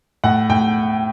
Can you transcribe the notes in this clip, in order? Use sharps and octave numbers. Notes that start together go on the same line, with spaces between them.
A2 F#5
A2 G5